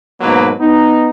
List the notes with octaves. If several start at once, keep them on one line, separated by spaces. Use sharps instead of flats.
G#2 B2 F#3 A#3 B4
B3 D#4